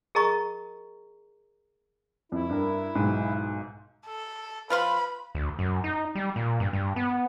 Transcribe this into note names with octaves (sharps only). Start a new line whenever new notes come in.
G#4 A#4 D#5 A#5 C#6
F2 E4
G2 A#4
B1 G#2
A4
F3 B4 F5 B5 C6
D2
F#2
D#4
G3
A#2
G2
G2
B3